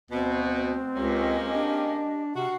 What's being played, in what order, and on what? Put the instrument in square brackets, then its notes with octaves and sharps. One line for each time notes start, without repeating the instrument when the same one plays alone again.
[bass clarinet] D2 [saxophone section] B2 [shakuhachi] C4
[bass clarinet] C#2 [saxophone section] G#3 A#3 C#4 [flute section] G4 D#5
[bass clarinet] D4
[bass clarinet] C3 [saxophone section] F#4 [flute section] F5 [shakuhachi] F#5